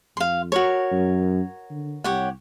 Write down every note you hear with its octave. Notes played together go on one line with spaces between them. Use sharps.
F2 F5 C6
F#4 A#4 C#5
F#2
D3
C2 G4 C#5 F#5